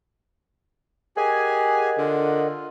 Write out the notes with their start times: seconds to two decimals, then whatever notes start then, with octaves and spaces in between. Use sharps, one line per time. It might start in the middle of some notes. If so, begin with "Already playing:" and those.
1.17 G4 G#4 A#4 D#5 F#5 G#5
1.98 D3 F4